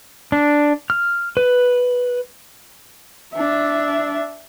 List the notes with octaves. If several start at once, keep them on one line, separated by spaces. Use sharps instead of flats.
D4
F6
B4
D4 E5